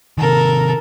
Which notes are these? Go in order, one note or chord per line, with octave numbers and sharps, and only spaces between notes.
C3 D#3 A4 A#4